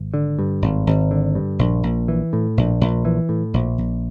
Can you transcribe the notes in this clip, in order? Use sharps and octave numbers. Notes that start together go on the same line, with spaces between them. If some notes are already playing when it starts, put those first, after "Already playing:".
Already playing: G#1
D3
G2
G#1
G#1
D3
G2
A#1
A#1
E3
A2
A#1
A#1
E3
A2
A#1
A#1